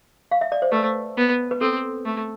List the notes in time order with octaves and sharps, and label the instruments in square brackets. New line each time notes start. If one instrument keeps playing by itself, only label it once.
[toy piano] F5
E5
D5
C5
[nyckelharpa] A3 [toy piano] B4
[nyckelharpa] B3
[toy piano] B4
[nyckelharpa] C4 [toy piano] A4
[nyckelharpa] A3